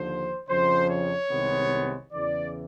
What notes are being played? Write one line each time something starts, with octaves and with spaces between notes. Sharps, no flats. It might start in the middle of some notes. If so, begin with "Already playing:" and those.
Already playing: D#2 D3 F3 C5
F2 C#3 F3 C5
C#5
C2 C3 D#3 G#3 B3
E2 C#3 E3 D5